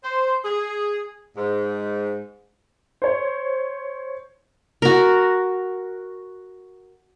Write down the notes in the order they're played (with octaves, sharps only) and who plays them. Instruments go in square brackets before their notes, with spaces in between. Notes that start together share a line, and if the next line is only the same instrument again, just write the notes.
[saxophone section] C5
G#4
G#2
[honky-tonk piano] C5 C#5
[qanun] F#4 A#4